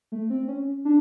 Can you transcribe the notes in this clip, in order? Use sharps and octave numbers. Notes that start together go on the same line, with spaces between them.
A3
C4
C#4
D4